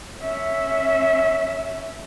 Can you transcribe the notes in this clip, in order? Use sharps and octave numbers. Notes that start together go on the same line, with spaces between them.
C#4 E5